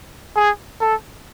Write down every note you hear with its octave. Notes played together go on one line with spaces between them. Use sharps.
G#4
A4